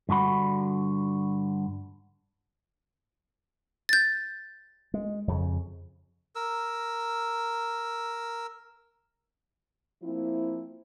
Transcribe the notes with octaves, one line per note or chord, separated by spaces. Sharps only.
G2 D3 F#4 B5
G6 A6
G#3
F2 C#3
A#4 E6
F3 A#3 C4 E4